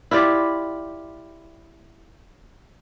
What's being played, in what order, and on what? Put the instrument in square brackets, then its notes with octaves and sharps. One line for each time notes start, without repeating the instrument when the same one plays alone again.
[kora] E4 F4 G4 D5